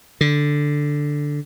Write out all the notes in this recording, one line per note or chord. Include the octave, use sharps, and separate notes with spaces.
D3